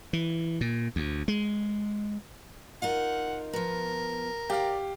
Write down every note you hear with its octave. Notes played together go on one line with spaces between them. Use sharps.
E3
A#2
D2
G#3
D#4 F4 A#4 F#5
F3 B3 A#4
G4 D5 F5 G5